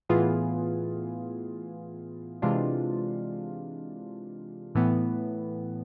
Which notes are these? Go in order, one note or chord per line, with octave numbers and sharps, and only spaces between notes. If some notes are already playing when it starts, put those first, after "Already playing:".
A2 E3 B3 F4 G#4
C3 E3 G#3 D4 F4
A2 E3 B3